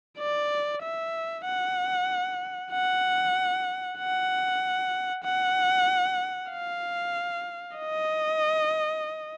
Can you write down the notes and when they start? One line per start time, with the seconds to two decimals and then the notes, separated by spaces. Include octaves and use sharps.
0.18 D5
0.83 E5
1.45 F#5
2.72 F#5
3.98 F#5
5.24 F#5
6.51 F5
7.78 D#5